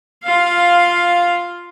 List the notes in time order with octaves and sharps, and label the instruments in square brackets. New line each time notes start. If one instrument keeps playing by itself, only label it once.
[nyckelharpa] F4 F5